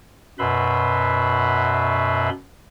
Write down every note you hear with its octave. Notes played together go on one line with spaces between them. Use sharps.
F#2 B2 B4 E5 B5 C6